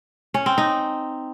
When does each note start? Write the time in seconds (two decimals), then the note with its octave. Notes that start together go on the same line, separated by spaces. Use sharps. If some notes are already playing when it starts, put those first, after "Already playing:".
0.34 C#4
0.46 C4
0.58 D#4